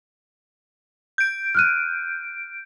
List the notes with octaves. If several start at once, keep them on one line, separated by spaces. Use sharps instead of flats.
G6 D7
F6 F#6 D#7